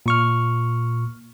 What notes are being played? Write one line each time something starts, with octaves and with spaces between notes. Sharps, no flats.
A#2 C#6 F6